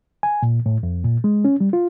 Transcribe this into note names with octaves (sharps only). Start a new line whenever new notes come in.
G#5
A#2
A2
F2
A#2
G#3
C#4
G3
F4